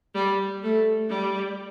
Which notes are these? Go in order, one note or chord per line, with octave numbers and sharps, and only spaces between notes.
G3
A3
G3